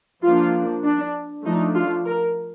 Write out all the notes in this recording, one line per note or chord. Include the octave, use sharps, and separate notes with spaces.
F3 A#3 D4 F4
D4
F3 A3 D4 D#4
F4
A#4